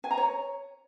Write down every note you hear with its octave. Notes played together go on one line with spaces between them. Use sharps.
G#5
A#5
C#5